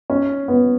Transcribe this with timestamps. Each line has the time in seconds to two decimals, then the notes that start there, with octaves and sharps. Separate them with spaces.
0.10 C#4
0.48 B3